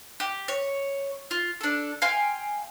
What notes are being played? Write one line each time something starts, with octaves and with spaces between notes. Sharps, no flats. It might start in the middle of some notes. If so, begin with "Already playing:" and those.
G4
C#5
F4
D4 A4
F5 G5 G#5 C6